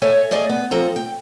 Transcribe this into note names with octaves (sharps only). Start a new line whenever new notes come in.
A4 C#5 D#5 E5 G#5
A3 G#4 D5 D#5 G#5
B3
F3 C4 A4 A#5
G5